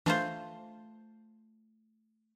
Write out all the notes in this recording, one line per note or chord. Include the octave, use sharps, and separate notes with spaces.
E3 A3 D4 F4 C5